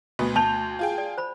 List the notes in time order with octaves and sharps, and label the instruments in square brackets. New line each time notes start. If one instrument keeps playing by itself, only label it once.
[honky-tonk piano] D2 B2 B3
[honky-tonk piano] D2 G6 F7 [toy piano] A5
[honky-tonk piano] F4 G#4 G5
[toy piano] D5
C5 B5